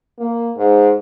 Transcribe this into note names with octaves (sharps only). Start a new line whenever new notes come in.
A#3
G#2